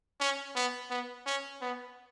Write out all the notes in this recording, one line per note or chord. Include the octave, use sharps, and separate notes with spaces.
C#4
B3
B3
C#4
B3